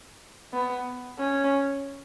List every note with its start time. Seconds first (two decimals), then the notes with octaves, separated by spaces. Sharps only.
0.54 B3
1.19 C#4